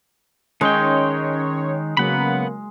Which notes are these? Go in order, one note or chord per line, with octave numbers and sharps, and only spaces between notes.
D#3 G#3 C#4 D#4 C#5 G5
C#3 F#3 A#3 B3 F#5 B5